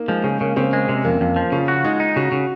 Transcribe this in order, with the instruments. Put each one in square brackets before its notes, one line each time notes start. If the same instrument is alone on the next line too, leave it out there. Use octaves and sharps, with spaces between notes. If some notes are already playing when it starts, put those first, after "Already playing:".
Already playing: [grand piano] A#3 D#4
[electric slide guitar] F3 [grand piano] G#3
[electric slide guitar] C#3 [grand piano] G#3
[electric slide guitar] C#3 [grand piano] A#3
[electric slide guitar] C#3 [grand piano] C4
[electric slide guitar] G#3
[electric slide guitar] C3 [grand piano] C#4
[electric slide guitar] F2 [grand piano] A#3
[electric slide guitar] F2 [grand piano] F4
[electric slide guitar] F3
[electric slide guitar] C#3 [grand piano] F4
[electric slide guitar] F#4
[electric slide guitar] G#3 [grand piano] D#4
[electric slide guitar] D#4
[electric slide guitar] C#3 [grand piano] F#4
[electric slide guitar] C#3